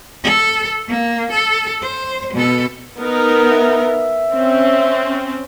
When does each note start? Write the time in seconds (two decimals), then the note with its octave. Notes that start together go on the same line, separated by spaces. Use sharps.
0.23 A4
0.88 A#3
1.31 A4
1.82 C5
2.33 B2 A4
2.99 B3 D#4 A#4
3.52 E5
4.32 C4 C#4